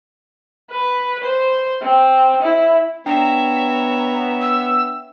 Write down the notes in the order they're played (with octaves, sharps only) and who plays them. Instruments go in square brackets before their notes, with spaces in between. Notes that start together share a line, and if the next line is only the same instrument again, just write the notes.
[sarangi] B4
C5
C4
E4
[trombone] B3 [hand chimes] D4 G5 [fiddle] C#5 E5 [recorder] A#5
[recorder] E6